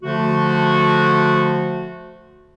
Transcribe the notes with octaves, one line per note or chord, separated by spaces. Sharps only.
D3 F3 A3 F#4